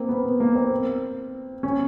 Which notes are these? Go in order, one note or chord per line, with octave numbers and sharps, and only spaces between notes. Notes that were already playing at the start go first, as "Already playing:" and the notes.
Already playing: A#3 C4
B3
A#3
C4
C#4